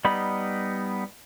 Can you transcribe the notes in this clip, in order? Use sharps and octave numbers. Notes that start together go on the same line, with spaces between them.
G3 B3 D#4 B5